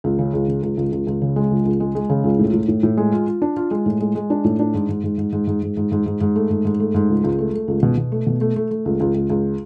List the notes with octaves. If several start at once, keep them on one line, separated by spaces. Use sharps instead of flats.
C#2
C#3
C#2
C#3
C#2
C#2
C#2
C#2
C#3
G#3
C#2
C#2
G#3
G#3
C#3
C#2
A2
A2
A2
A2
G#3
F4
F4
D4
F4
G#3
A2
G#3
G#3
D4
A2
D4
G#2
G#2
G#2
G#2
G#2
G#2
G#2
G#2
G#2
G#2
G#2
A3
G#2
G#2
A3
G#2
C#2
C#2
A3
A3
C#2
B2
B2
A3
B2
A3
A3
A3
C#2
C#2
C#2
C#2